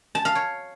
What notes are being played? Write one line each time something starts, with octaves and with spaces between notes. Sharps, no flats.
A5
F5
C#5